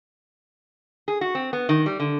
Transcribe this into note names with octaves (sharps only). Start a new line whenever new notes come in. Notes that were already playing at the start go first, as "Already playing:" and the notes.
G#4
F#4
C4
B3
D#3
G3
D3